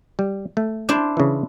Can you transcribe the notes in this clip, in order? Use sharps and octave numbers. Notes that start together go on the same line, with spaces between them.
G3
A3
D4 E4 C5
C#3 E3